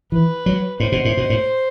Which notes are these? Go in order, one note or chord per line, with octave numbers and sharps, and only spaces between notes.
E3 B4
F#3
A2 C5
B2
A2
B2
A2